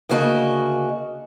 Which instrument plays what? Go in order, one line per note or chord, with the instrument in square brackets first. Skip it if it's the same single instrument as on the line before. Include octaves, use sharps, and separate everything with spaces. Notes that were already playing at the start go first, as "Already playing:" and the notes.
[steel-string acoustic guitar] D2 C#3 A#3 F#4 D#5 A5